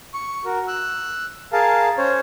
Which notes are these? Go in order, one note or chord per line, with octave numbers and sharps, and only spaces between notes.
C#6
F#4 A#4
E6 F#6
G#4 A#4 F5 A5
C#4 C5 C#5